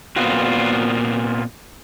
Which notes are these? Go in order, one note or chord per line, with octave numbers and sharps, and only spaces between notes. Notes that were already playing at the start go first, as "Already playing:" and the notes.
A#2 B3 C4 F4 F#4